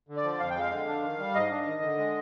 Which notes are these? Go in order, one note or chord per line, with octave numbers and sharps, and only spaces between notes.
D3
D5
F3
F2 F5
G5
G#3 F5
D3
D4
D#3
G3
G#2 D#5
D4
D#3
D3
G#3